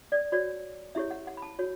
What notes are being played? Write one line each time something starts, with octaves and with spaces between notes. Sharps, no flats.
D5
F#4 C#5 D5
E4 G4 C#5 E5
F#5
F#5
B5
A5
F#4 C#5